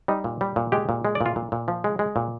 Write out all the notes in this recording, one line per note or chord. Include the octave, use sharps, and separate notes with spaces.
G3 D#4
A#2
G3
A#2
G#3 G4
A#2
G#3
D5
A#2
F4
A#2
A#2
F3
G#3
G#3
A#2